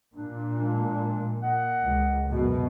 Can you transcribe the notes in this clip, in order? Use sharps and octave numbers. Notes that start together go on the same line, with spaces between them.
A#2 D4
F3 G#3 D4
A#4 D#5 F#5
C#2
F#2 B2